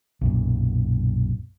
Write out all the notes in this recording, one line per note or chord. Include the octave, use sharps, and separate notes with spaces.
B1 F#2 A#2